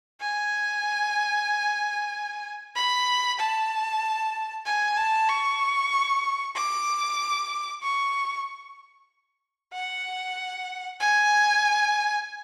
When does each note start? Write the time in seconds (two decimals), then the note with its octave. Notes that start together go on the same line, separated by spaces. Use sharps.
0.21 G#5
2.76 B5
3.39 A5
4.65 G#5
4.97 A5
5.29 C#6
6.56 D6
7.83 C#6
9.73 F#5
11.00 G#5